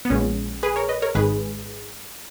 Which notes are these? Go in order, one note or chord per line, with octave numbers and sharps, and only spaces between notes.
B3
A#1 A#2 G#3 C#4
G#4 B4
A#4 C#5
B4 D#5
A#4 C#5
G#1 G#2 D#3 G#3 G#4 B4